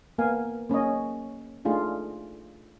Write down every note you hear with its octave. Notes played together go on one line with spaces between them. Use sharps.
A#3 B3 A#4 F5 G#5
A#3 C#4 C#5 D#5
A3 D4 D#4 F4 G#4 A4